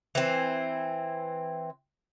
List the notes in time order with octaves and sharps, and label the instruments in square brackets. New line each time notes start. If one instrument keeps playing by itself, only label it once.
[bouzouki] E3 C4